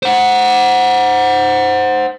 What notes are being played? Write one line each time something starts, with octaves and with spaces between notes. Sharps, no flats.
C5 F#5